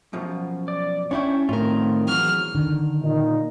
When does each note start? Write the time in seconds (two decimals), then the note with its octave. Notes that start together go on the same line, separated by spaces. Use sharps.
0.13 F#2 B2 F3
0.68 D5
1.11 C#4 D4 E4 C#5 G5 C#6
1.49 A2 D#3 A3 C4 F4 A#4
2.08 E2 E3 F#3 F6
2.55 D3 D#3
3.03 A#2 D#4